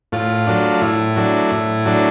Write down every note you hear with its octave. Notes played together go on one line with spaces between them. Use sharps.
A2 F4
F#3 A3 D4
A2 E4
F#3 A3 D4
A2
F#3 A3 D4